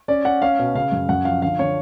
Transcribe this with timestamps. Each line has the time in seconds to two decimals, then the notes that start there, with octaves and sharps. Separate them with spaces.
0.08 C#4 D5
0.25 C#4 F#5
0.42 C#4 F5
0.59 B2
0.75 C#3 F5
0.92 F#2
1.09 F#2 F#5
1.25 F3 F5
1.42 D3 F5
1.59 D3 C#5